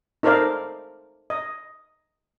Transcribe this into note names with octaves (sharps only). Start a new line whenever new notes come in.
D#4 A4 A#4 C5 D5 F5
D#5